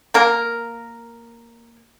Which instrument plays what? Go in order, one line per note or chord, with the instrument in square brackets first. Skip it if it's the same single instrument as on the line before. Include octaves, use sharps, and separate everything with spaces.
[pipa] A#3 A#4